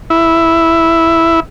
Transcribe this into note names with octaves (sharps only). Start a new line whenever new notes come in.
E4